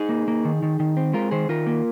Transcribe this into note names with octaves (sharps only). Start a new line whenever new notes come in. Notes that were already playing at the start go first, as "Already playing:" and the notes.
Already playing: D#4 G#4
A#3
A#3
D#3
D#3
D#3
C4
G#3 F4 A#4
D#3 G#4 C5
D#3 F4 A#4
A#3